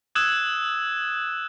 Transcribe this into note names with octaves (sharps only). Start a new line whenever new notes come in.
D#6 E6 F#6 G#6 E7